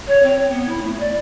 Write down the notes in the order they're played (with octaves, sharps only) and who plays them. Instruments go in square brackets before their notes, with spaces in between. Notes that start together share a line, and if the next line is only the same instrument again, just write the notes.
[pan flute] C#5
C4
B3
E4
A3
D5